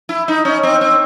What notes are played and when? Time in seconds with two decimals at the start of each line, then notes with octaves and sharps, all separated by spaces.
0.09 E4
0.28 D#4
0.45 C#4
0.63 C4
0.81 C4